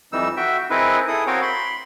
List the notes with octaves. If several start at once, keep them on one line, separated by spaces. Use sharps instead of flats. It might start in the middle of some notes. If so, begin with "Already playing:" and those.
F2 E3 G3 D#4 E6
F#4 E5 G5
C4 D#4 E4 G#4 A#4 B4
E4 G#4 A4 D#6
C4 F#4 A#4 C#5 F5 G5
B5 C6